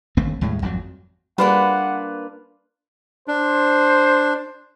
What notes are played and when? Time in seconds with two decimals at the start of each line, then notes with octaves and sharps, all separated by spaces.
0.17 G1 D#2 A3 C4
0.41 D#2 A2 G3 G#3
0.62 G#1 F2 C#3 F#3
1.38 G3 A#3 D4 F4 B4 F#5
3.28 D4 C5